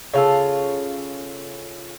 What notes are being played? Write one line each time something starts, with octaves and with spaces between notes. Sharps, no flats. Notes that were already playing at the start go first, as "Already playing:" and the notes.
C#3 F4 A4